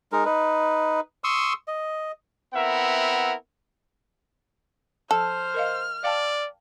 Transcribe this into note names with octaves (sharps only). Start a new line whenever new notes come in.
G#3 D#4 A#4
D#4 B4
C6 C#6 D#6 E6
D#5
B3 C4 E4 A#4 E5 F#5
F3 A4 C5 F6
A#4 D#5 F5
D5 F5 G5 A5